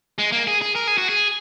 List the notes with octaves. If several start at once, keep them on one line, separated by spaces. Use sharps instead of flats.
G#3
A#3
G#4
G#4
A#4
G#4
F#4
G#4